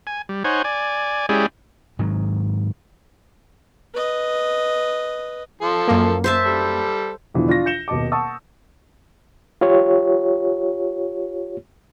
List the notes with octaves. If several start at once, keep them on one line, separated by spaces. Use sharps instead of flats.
G#5
G3
D#4 C5 C#5 F#5 G#5
D5 G#5
G#3 C#4 E4 G4 G#4 D5
G#2 D#3 F#3
B4 D#5
F3 A4
F#2 A#3
C5 E5 A5
G3 A4
E2 B2 D3 E3 F3
D4 F4 C#6 A#6
G6 C#7 E7 G7
D#1 B2 D#5 A5 D6
F#5 A5 C#6 D#6 E6
F4 G4 C#5